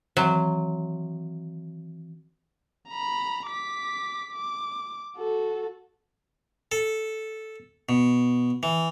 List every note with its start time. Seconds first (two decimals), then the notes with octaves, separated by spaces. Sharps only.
0.17 D#3 E3 F#3 C4
2.89 A#5 B5
3.47 D6 B6
4.31 D6
5.17 F#4 A4
6.72 A4
7.89 B2
8.63 E3